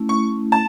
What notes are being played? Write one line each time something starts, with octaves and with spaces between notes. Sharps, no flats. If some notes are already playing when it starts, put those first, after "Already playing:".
Already playing: A3 C#4 E4
C#6
A5